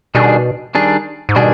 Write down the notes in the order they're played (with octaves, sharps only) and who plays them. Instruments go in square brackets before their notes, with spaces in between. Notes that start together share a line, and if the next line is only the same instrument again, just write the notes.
[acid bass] B2 [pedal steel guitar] D#3 G3 D4 G#4
[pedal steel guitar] D#3 G3 D4 G#4
[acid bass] G#2
[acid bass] B2 [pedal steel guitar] D#3 G3 D4 G#4